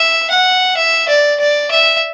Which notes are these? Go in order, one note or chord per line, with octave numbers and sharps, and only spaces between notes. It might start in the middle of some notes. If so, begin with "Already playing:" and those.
Already playing: E5
F#5
E5
D5
D5
E5